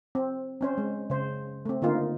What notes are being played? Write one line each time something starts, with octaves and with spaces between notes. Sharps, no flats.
C4
C4 C#4 C5
G#3
C#3 C5
A3 C4
D3 A#3 D#4 F4